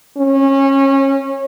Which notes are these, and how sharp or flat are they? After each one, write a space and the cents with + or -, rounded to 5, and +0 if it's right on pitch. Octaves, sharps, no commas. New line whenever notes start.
C#4 -25